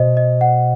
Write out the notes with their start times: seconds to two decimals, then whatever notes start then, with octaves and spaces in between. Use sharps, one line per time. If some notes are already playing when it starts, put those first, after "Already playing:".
Already playing: B2 C5 D#5
0.17 D#5
0.41 F#5